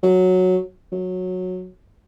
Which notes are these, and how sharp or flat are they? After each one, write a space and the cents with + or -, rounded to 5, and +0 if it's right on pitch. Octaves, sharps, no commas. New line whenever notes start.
F#3 -5
F#3 -15